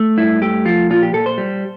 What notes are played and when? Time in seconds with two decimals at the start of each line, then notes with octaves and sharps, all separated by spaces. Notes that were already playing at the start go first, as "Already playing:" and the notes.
Already playing: A3
0.18 G2 E4
0.42 A3 G4
0.65 F3 F4
0.90 A#2 F4
1.02 G4
1.14 A#2 A4
1.26 C5
1.38 G3